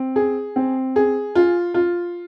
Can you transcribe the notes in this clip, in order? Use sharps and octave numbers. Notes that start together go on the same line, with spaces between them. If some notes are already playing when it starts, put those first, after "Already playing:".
Already playing: C4
G#4
C4
G#4
F4
F4